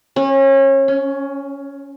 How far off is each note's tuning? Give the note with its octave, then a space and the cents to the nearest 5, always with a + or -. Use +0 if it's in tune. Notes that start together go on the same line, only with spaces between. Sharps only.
C#4 -30
C#4 +15